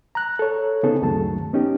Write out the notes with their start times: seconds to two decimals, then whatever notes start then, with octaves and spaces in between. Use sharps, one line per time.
0.15 A#5 F#6
0.39 A4 C#5
0.83 C#3 B3 C4 D#4 G#4 A4
1.02 D2 G2 D#3 F#3 A3 A5
1.53 B3 C#4 D#4 G4